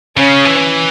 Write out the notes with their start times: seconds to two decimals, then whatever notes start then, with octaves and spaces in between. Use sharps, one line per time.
0.17 C#3 C#4
0.45 E3